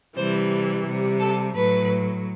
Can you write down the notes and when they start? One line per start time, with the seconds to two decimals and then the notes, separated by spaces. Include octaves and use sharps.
0.17 C3 E3 G3 C5
0.86 C3 G3
1.20 A4
1.55 A2 F#3 B4